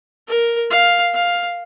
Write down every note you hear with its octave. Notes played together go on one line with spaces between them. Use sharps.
A#4
F5
F5